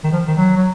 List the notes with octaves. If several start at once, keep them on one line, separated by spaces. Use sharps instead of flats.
D#3
F3
D#3
F#3
F#3